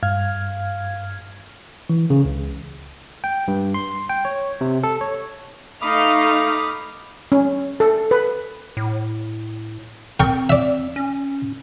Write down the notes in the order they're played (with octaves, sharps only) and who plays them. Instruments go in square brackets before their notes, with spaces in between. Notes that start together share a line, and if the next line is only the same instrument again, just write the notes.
[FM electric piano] G2 F5 F6 G#6
[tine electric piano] E3
C#3
C#2
G5
G2
C6
G5
C#5
C3
A4
C#5
[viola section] A3 D#4 F5 [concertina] B5 D6 D#6
[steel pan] C#4
A4
B4
[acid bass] A2
[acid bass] C4 [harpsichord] A#4 G5 C#6
[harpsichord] D5 E5
[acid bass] C#4